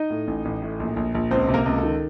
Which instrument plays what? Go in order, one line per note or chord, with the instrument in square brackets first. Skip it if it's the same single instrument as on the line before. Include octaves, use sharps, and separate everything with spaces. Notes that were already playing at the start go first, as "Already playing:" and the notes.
Already playing: [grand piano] D#4 D#5
A2
A1
A1
A2
A#1
A#1
A#1
C#2 C4 C5
C3
A#3 A#4
C#2
A4
D#3